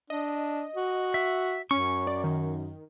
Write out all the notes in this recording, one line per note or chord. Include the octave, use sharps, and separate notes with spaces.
D4 D#5
F#4
E5
F#2 C#4 C#6
D5
D#3